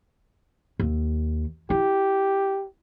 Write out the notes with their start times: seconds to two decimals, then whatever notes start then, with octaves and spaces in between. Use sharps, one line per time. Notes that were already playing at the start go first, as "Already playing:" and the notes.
0.79 D#2
1.70 E4 G4